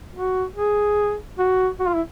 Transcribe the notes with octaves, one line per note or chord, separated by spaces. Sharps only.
F#4
G#4
F#4
F#4
F4
E4